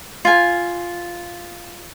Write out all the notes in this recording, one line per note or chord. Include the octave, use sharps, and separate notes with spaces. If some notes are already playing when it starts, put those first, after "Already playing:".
F4 G#5